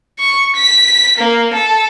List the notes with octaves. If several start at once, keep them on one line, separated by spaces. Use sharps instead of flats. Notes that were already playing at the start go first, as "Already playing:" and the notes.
C#6
B6
A#3
A4